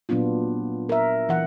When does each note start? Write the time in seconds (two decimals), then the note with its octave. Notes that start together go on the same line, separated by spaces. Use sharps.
0.09 A#2 F#3 B3 D4 F4
0.89 A#4 E5
1.29 E3 F#5